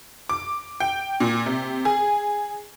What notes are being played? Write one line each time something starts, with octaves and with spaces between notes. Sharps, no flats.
D6
G5
A#2
C3
G#4